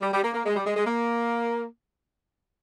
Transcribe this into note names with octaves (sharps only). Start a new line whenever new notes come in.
G3
G3
A#3
A#3
G#3
G3
G#3
G#3
A#3